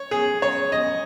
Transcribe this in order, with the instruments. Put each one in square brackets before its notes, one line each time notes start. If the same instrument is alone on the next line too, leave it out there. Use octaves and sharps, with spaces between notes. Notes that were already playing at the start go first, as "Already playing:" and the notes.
Already playing: [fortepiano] C#5
G#4
C#5
D#5